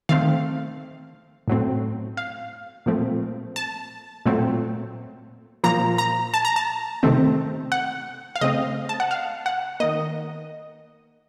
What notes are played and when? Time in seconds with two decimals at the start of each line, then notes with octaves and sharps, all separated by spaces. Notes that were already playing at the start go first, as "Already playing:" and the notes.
0.09 D#3 A3 C4 F5
1.48 A2 F#3 A3 C4
2.17 F5
2.86 A#2 F3 A3 C4
3.56 A5
4.26 A#2 F#3 A3 C4
5.64 A#2 F3 A#3 A#5
5.98 A#5
6.34 A5
6.45 A#5
6.56 A5
7.03 C3 D#3 A3 C4
7.72 F#5
8.36 F5
8.41 C#3 A3 C4 D#5
8.89 A5
9.00 F#5
9.11 F5
9.46 F#5
9.80 D#3 A#3 D#5